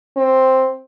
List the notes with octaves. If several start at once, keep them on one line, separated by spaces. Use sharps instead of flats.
C4